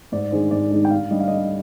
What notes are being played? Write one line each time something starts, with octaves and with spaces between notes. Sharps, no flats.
G#2 D5
D#3 G#3 D4 C5
G#2 D5
D#3 G#3 D4
G5
D3 F5
G3 D4 D#5
F5
D3 D#5